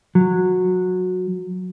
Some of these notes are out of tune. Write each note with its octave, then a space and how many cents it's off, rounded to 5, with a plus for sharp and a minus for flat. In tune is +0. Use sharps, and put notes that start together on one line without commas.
F#3 -15